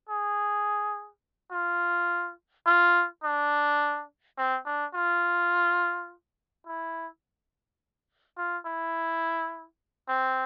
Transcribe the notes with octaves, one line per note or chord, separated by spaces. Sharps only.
G#4
F4
F4
D4
C4
D4
F4
E4
F4
E4
C4